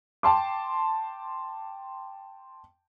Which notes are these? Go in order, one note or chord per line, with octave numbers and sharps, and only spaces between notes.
G5 A5 C6 D6